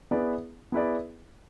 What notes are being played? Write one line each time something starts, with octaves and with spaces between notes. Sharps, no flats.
B3 E4 G#4 B4 D5
B3 E4 G#4 B4 D5